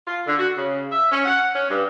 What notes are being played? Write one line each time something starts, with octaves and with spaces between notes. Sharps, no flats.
F4
D3
F#4
C#3
E5
C#4
F#5
C#4
G2